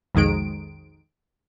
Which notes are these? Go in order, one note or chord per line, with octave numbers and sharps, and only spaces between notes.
B1 F2 D#3 G#3 D7